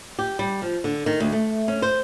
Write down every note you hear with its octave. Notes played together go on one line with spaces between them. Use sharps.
G4
G3
F3
D3
D#3
D2
A3
C#4
C5